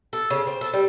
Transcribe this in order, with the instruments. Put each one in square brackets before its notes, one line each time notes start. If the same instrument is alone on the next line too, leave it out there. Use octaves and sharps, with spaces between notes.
[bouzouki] A4
C#3
C4
A4
G3